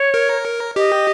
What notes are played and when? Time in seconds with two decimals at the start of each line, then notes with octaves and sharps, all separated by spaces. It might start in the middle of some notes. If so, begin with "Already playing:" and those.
Already playing: C#5
0.14 A#4
0.76 G4 D#5